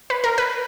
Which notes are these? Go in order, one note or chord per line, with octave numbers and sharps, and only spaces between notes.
B4
A#4
B4